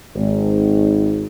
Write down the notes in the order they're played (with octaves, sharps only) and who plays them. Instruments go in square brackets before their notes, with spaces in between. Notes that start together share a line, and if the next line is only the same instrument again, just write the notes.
[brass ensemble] G#1